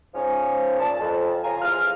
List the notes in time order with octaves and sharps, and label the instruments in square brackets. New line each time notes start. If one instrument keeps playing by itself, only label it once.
[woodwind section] G#2 F3 C#4
A#2 A5
F2
C#3 F4 G#5 A#5
E2 F3 F4 F6